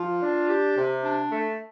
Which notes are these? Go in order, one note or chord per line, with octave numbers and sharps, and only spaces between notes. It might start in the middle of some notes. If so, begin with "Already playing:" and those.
Already playing: F3 F4
D4
G4
C3
D4
A3